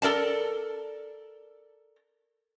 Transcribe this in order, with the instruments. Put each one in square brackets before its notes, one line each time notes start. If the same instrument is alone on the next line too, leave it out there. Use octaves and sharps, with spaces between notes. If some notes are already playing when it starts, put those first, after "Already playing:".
[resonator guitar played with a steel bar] A4 A#4 D5 A5